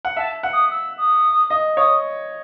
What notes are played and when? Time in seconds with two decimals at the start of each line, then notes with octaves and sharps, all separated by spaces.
0.05 F#5
0.17 E5 A5
0.43 F#5
0.53 D#6
0.71 E6
0.98 D#6
1.50 D#5
1.77 C#5 D#6